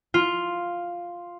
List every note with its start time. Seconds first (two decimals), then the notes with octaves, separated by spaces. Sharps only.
0.14 F4